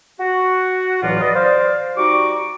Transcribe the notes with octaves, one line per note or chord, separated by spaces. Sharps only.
F#4
C#2 A2 E3 F#3 F4 D5
B4 D5 D#5
C5 D5 F5
G3 D#4 F#4 C#6 D6